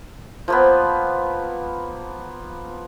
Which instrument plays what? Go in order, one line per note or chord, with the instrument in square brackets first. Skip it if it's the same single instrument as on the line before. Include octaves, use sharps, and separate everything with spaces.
[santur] F3 A#3 B3